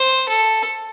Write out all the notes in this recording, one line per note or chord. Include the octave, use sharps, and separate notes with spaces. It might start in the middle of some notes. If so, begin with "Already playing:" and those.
Already playing: C5
A4